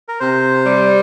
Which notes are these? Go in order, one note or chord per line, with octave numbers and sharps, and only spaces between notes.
A#4
C3 C5
G3